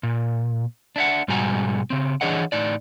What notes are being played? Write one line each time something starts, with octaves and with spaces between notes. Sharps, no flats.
A#2
D4 E5 F#5
G#2 B2 G3 F#4 G#5 A#5
C#3 C4
E3 D4 G#4 C#5 D#5 F#5
A2 D#4 D5